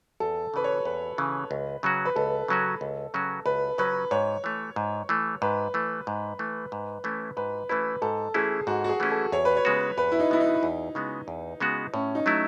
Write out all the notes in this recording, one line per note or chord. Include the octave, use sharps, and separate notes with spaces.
E2 A4
C#3 E3 B4
C#5
E2 B4
C#3 E3
C#2
C#3 F#3 C#4 F#4
B4
C#2 A4
C#3 F#3 C#4 F#4
C#2
C#3 F#3 C#4 F#4
C#2 B4
C#3 F#3 C#4 F#4 B4
G#2 C#5
E3 A3
G#2
E3 A3
G#2 B4
E3 A3
G#2
E3 A3
G#2
E3 A3 C#4 E4
G#2 B4
E3 A3 C#4 E4 B4
G#2 A4
E3 A3 C#4 E4 G#4
G#2 F#4
F#4
G#4
E3 A3 C#4 E4
A4
E2 C#5
B4
C#5
C#3 G#3 B3 F#4
E2 B4
E4
D#4
C#3 G#3 B3 E4 F#4
D#4
E2
C#3 G#3 B3 F#4
E2
C#3 G#3 B3 F#4
A2 C#4
D#4
F#3 A3 E4